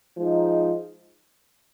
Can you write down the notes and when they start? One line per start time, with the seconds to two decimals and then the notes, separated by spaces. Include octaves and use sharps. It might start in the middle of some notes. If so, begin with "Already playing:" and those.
0.17 F3 G#3 D#4